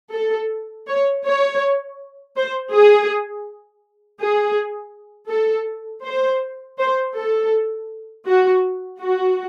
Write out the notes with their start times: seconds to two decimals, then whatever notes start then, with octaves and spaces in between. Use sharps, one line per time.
0.14 A4
0.88 C#5
1.26 C#5
2.37 C5
2.73 G#4
4.20 G#4
5.31 A4
6.05 C5
6.79 C5
7.16 A4
8.27 F#4
9.01 F#4